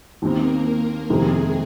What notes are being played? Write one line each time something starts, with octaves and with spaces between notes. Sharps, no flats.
D#2 D#3 A#3 C4 A#4
F2 C3 D#3 G#3 A#3 G#4